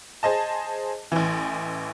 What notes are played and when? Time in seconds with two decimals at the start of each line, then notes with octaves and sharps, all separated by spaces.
0.23 G#4 C5 D#5 A5
1.12 A1 E3